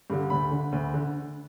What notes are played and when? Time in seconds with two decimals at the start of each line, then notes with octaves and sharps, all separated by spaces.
0.10 G2 D3
0.30 D2 B5
0.51 D3
0.72 D2
0.94 D3